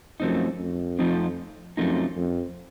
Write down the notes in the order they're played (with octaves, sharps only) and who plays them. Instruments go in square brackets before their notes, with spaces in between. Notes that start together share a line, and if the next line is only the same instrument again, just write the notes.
[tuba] F#2 [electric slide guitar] F3 A3 C4 D#4
[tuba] F2
[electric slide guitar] F3 A3 C4 D#4
[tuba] F#2 [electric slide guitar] F3 A3 C4 D#4
[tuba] F2